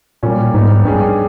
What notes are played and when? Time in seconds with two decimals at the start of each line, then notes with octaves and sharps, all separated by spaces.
0.23 A#2 G3 A#3 C#4
0.54 G#2 D#3 G3 B3 D#4
0.85 G2 G3 C#4 G#4
0.95 G2